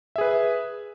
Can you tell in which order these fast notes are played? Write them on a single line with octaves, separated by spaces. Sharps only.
E5 G#4 B4